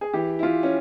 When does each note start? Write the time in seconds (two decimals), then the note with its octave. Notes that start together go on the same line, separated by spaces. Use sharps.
0.01 G#4
0.13 E3 G4
0.39 E4
0.43 E3 F4
0.63 C#4